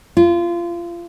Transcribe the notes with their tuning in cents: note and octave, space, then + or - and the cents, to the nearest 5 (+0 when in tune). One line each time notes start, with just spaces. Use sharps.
F4 -25